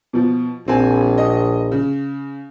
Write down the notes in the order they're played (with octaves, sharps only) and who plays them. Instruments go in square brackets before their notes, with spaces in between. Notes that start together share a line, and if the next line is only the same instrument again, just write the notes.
[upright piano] B2 F3
[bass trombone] A#1 [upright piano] C4 G#5
[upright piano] D#5
C#3